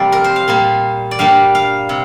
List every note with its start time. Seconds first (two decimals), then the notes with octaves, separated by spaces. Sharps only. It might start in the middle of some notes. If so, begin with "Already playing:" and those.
Already playing: F2 C3 G3 A#3 D5 G5
0.12 A#4
0.24 C5
0.36 F5
0.48 A#2 G3 A#3
1.11 D5
1.19 G2 G3 A#3 F5
1.55 F5
1.89 C3